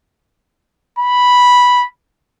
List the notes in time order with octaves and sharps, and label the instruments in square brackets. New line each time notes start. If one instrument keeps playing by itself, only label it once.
[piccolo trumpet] B5